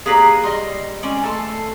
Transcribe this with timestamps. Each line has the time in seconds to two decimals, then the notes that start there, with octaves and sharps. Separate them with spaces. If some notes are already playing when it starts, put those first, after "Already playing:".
0.06 A#3 G4 G#4 B4 D5 A#5
0.43 G3 D#5 C6
1.03 G#3 C#4 D5
1.23 A3 A4 A5 C6